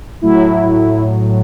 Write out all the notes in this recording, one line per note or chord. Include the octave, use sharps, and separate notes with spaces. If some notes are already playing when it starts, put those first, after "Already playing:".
A2 F#3 E4